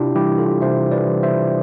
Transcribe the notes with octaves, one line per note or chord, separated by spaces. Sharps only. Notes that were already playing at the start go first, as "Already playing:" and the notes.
Already playing: C3 D4 E4 F4 G4
E3 G3 E4 G4
F4 A4
C3 C5 E5
B4 D5
E3 G3
C5 E5